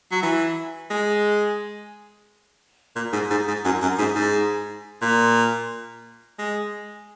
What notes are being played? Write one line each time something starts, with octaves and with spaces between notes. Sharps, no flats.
F#3
E3
G#3
A#2
G#2
G#2
G#2
F#2
F#2
G#2
G#2
A#2
G#3